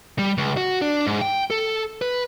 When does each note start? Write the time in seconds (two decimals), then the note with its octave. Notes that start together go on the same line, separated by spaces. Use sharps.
0.19 G3
0.38 C#2
0.57 F#4
0.82 D4
1.06 G#2
1.21 G5
1.50 A4
2.02 B4